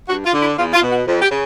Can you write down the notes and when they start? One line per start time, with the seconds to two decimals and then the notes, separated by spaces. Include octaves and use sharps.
0.08 G2 F#4
0.25 F4
0.33 D3
0.40 E4
0.57 E2 F4
0.74 F4
0.82 B2
0.90 F#4
1.06 F2
1.22 G4
1.30 C#3